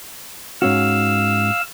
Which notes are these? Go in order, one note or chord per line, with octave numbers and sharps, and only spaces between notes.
G#2 C#4 F#4 F5 E6